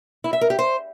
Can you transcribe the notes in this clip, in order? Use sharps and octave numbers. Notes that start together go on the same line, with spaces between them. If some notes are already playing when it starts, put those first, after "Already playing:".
E4
E5
A#4
G4
C5